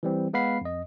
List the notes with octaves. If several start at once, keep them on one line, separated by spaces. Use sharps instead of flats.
E3 G3 C4
G#3 B3 F5 F#5 B5 C7
F2 D#5